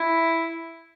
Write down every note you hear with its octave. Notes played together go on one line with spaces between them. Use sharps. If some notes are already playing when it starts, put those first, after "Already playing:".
Already playing: E4